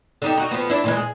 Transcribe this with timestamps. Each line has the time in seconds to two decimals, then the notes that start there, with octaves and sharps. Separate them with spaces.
0.22 D3 D#4 G4
0.38 D#4 F#4
0.51 F3 B3
0.70 D4 E4
0.84 A#2 E3 G#3
0.97 G#4